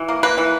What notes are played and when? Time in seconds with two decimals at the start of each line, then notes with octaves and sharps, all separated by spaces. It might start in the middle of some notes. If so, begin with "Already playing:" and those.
Already playing: E3
0.08 A#3
0.23 A#3 B4
0.38 E3